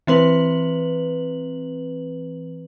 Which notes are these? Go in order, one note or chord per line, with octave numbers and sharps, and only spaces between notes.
E3 C4 B4 F#7